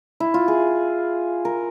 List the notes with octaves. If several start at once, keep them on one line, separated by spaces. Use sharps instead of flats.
E4
F4
G#4
A#4